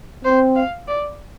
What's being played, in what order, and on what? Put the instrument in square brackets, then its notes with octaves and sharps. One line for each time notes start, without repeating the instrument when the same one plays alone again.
[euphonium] C4 [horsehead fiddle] C5
[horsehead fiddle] F5
D5